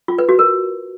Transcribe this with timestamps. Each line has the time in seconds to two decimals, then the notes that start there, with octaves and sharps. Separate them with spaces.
0.08 F4
0.18 B4
0.29 F#4
0.39 A#4